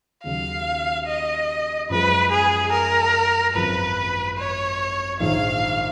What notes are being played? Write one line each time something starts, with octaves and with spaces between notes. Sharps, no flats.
D#2 C#3 F#3 F5
D#5
F#2 F3 G#3 B4
G#4
A#4
G#1 F#2 F3 G#3 B4
C#5
A#1 G#2 D#3 F5